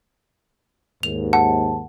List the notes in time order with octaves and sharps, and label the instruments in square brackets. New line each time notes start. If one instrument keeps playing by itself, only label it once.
[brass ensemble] D#2 G#2 [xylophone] F7
[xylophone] F#5 [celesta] A5